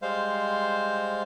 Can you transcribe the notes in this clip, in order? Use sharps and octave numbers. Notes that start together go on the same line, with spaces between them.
G3 G#3 C5 F5